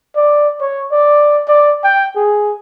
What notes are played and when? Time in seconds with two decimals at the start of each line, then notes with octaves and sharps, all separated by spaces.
0.16 D5
0.61 C#5
0.91 D5
1.48 D5
1.84 G5
2.16 G#4